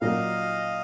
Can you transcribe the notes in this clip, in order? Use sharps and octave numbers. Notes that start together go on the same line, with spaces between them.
A#2 F#3 A#3 D#5 F5